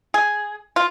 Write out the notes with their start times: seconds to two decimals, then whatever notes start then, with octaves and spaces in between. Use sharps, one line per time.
0.14 G#4
0.76 F4